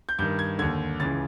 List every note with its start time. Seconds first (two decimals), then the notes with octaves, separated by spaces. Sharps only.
0.09 G6
0.19 G2 D#3 G6
0.39 G#6
0.59 D#2 D3 G#6
1.00 C#2 C#3 E3 A6